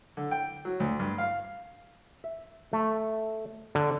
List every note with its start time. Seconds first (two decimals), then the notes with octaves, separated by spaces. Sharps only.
0.17 D3
0.31 G5
0.65 F#3
0.80 D2
0.99 G2
1.18 F5
2.24 E5
2.73 A3
3.75 D3